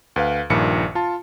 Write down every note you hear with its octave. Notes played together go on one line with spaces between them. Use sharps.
D2 B4 F5
A#1 G2 A#2 D#3 C#7
F4 A5